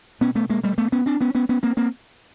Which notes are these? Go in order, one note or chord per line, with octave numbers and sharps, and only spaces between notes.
B2 B3 C#4
A3 B3
G#3 A#3
G3 A3
A3 B3
B3 C#4
C4 D4
B3 C#4
B3 C#4
B3 C#4
A#3 C4
A#3 C4